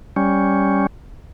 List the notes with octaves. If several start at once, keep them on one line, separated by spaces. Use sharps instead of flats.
G3 C#4